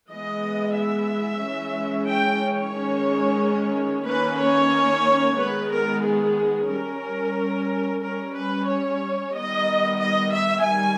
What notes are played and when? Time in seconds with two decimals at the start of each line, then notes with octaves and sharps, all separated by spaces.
0.10 E3 G#3 B3 D#5
0.76 E5
1.42 E3 G#3 C#4
2.08 G5
2.41 C#5
2.74 D#3 G#3 C#4
4.06 D#3 A#3 C#4 B4
4.39 C#5
5.38 D#3 G#3 B3 B4
5.71 A#4
6.04 G#4
6.70 G3 C#4 A#4
8.02 G3 C#4 A#4
8.35 B4
8.68 C#5
9.34 D#3 G3 B3 D#5
10.00 D#5
10.33 E5
10.66 D#3 G3 G#5